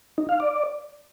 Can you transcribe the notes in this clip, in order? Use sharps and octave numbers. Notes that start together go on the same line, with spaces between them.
D#4
F5
D5